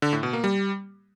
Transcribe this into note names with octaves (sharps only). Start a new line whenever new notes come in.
D3
A2
B2
A#3
G3